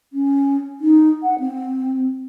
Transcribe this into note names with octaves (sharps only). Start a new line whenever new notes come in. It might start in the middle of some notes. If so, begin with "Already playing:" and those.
C#4
D#4
F#5
C4